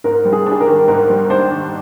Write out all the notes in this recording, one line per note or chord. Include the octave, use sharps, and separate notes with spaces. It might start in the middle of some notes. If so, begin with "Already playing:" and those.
G#2 A#4
G3
G#4
D4
G#4
A#4
D#3
G#2 A#4
G3
D4 C5
D#3